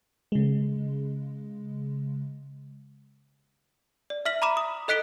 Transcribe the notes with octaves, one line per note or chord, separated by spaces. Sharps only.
C#3 G#3
D5
E5 F6 B6 F#7
A#5 B5 D6 E7
D#6
A4 D#5 F#6 B6 D7 G7